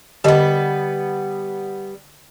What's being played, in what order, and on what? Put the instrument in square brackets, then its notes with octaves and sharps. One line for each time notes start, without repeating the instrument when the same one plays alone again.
[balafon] D3 G4 D#5 [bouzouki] G3 B3